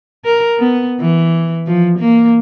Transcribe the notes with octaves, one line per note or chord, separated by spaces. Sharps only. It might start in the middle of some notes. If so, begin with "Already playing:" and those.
A#4
B3
E3
F3
A#3